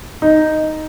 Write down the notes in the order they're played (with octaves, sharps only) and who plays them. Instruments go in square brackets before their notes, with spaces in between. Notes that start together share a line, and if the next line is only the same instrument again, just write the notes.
[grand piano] D#4